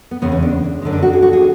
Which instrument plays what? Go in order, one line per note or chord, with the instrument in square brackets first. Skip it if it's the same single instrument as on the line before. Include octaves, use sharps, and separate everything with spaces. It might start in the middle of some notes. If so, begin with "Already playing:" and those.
[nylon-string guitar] B3
E2 C#3 G#3 B3
C#4
D4
F#2 D3 G#3
D4
F#4
G#4
F#4
G#4